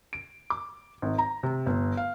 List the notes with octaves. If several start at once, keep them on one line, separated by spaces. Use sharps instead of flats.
D7
D6
G#1
A#5
C3
G1
F5